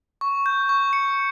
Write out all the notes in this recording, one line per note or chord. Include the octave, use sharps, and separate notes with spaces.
C#6
G6
C#6
C#7